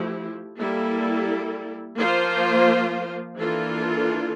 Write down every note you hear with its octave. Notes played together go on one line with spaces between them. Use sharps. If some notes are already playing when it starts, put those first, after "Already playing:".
Already playing: F3 A3 E4 G4
G3 A#3 E4 A4
F3 A#3 F4 C5
E3 A#3 D4 F4 A4